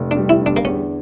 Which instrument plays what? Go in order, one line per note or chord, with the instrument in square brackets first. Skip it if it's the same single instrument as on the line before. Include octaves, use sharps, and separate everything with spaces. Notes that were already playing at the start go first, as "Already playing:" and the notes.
Already playing: [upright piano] F1
[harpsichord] D4
[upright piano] G3
[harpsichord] E4
[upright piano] D3
[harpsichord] D4
A#3
[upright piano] E2 [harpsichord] C#4